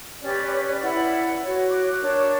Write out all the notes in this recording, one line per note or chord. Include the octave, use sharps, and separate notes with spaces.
C#4 G4 B4 D5
C#5
D5
E4 B4 D5 F#5
F#4 C#5
D6 F#6
D4 A#4 C#5